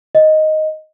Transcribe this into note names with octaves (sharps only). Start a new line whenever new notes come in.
D#5